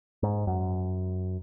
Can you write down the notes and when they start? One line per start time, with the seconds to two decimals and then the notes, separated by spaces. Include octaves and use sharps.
0.23 G#2
0.47 F#2